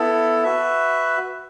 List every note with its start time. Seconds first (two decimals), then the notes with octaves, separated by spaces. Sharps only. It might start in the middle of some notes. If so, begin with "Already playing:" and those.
Already playing: B3 E4 A4
0.44 F#4 B4 E5